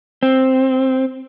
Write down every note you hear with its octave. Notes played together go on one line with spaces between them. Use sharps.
C4